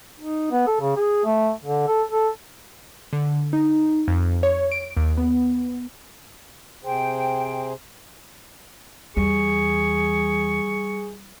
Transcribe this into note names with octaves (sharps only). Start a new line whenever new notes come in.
D#4
B3
A4
C#3
G#4
A3
D3
A4
A4
D3
D#4
F2
C#5
D7
D#2
B3
C3 G#4 C5 G5
E2 G3 G#4 C#6